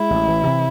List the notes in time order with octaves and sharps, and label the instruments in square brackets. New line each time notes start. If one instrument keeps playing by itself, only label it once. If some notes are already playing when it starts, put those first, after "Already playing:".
Already playing: [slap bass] G#3 [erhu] E4
[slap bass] A1
E3
C3